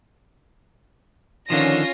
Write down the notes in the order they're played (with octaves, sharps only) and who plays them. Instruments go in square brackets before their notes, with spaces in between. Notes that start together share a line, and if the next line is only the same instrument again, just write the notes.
[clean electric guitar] D3 D#3 F3 [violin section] C#4 F4 A#6